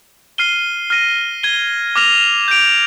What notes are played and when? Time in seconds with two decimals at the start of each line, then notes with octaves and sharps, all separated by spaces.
0.38 F6 C7 D#7 G7
0.90 F6 A#6 D#7
1.43 G#6 D#7 G7
1.96 D6 F6 A#6 F7
2.48 G6 D7 F7